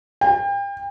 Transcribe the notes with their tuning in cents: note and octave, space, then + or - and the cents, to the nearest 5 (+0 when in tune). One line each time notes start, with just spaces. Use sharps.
G5 +35